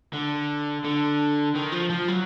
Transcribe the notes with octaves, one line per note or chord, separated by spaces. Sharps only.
D3
D3
D#3
F3
F3
F#3